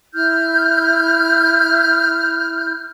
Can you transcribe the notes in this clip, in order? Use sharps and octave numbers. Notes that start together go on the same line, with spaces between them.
E4 F6 G6